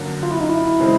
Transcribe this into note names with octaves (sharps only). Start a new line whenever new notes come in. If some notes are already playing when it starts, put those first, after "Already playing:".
Already playing: F#2 D3 F#3 A#3
F4
E4
D#4
E4
C#3 E3 G#3 C4